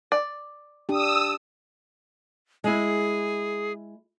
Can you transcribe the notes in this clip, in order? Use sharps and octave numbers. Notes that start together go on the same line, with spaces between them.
D5
D4 G4 D#6 E6
G#3 E4 G#4